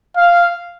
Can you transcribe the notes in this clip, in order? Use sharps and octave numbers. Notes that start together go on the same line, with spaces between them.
F5